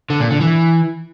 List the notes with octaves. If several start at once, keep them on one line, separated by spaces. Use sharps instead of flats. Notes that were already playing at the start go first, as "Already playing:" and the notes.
D3
A#2
D3
E3